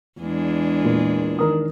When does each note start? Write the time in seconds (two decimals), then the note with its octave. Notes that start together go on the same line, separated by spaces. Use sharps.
0.20 E2 G#3 D4
0.84 A#2
1.39 D#3 A#4 D#6